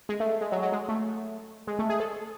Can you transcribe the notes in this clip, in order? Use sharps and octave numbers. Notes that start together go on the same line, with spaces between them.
G#3
A3
A3
G#3
F#3
F#3
G#3
A3
G#3
A3
G#4
A4